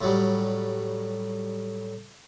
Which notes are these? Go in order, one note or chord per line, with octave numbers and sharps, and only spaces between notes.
A2 F#3 G3